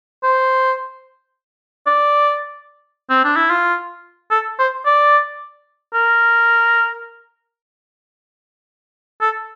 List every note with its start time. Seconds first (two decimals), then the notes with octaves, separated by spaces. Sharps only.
0.23 C5
1.86 D5
3.10 C4
3.24 D4
3.36 E4
3.50 F4
4.31 A4
4.59 C5
4.86 D5
5.94 A#4
9.21 A4